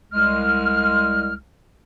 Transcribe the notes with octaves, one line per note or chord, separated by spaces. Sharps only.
C2 G#3 F6